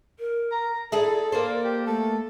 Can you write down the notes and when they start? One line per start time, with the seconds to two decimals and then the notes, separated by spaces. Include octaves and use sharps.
0.19 A#4
0.51 A#5
0.92 E4 G#4 A4 D5
1.32 A#3 C5
1.64 G4
1.87 A3 A4